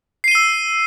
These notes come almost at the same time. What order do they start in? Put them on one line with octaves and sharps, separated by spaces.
C7 D#7 G7 E6